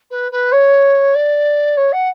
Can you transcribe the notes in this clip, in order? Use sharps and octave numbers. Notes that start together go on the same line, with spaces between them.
B4
B4
C#5
D5
C#5
F#5